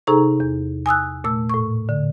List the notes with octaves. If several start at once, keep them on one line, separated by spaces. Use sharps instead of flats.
C3 D#4 G#4 A4 A#5 C#6
E2
G#5 D#6 E6 F#6
A#2 A3 E6
A2 C#6
D3